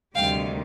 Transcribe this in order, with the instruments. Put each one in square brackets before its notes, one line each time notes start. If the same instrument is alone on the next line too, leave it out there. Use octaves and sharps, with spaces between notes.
[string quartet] D2 C3 D#3 G3 F5 G5